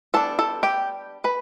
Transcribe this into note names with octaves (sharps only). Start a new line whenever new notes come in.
G3 B3 D4 A4 A5
A4 A5
G4 G5
B4 B5